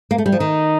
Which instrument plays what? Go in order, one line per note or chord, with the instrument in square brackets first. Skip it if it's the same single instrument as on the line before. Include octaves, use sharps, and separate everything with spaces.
[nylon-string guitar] A#3
A3
G3
F3
[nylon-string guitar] D#3 [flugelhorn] D#4